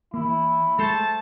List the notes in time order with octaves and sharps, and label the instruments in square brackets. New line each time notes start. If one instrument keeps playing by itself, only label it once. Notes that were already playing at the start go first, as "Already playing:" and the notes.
[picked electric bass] E3 A#3 [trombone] E4
[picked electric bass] G#3 [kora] A3 A4 C5 [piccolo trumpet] A5